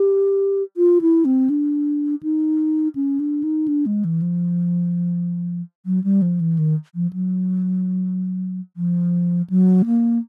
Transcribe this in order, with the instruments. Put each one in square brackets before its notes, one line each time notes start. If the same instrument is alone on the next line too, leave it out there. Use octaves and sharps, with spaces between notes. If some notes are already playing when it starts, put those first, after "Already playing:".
Already playing: [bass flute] G4
F4
E4
C4
D4
D#4
C#4
D4
D#4
D4
G#3
E3
F3
F#3
G3
F3
E3
D#3
F3
F#3
F3
F#3
A#3